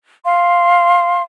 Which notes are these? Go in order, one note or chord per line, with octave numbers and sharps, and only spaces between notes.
F5 C6